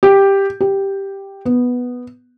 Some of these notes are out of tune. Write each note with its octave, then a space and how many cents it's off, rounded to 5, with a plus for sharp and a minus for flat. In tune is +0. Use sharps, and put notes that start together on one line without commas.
G4 +5
G4 +0
B3 +0